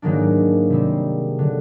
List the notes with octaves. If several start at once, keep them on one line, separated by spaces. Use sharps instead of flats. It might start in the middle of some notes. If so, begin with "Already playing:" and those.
G#2 D#3 F#3 A#3 D4
C3 D#3 G3 C4
D3 F#3